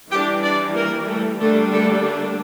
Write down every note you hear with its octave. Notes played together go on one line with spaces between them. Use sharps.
E3 G3 D4 G4 G5
D4 D5
A#3 A#4
A3 A4
D3 G3 A3 A#3 D4 A4
A3 A4
A3 A4